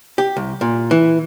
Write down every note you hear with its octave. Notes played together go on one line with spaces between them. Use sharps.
G4
C2
A#2
E3